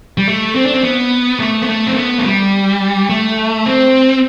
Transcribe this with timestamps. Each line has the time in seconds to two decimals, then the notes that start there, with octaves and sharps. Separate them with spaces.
0.18 G3
0.28 A3
0.55 C4
0.65 D4
0.73 C4
0.84 B3
1.40 A3
1.62 B3
1.69 A3
1.87 C4
1.97 B3
2.19 A3
2.25 G3
3.10 A3
3.66 C4